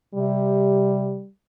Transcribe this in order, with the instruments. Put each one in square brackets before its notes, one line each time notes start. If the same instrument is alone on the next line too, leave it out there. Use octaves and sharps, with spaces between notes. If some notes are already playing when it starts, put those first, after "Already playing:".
[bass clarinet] C3 [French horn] G3